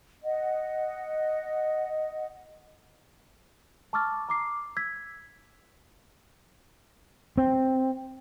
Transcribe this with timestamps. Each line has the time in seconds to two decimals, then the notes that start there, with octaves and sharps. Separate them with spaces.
0.24 D#5 F#5
3.93 A5 C#6 D6 E6 F6 A6
4.29 A#5 D6 C7
4.76 E6 G#6 B6
7.38 C4